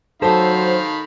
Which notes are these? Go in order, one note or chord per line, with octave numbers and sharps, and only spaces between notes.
D#3 F#3 A4 C5 F5 B5